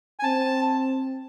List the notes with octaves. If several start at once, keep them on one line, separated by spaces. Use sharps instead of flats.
G#5
C4 A5